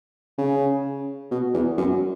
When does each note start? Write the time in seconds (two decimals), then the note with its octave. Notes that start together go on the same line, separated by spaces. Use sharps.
0.38 C#3
1.31 B2
1.54 E2
1.78 F#2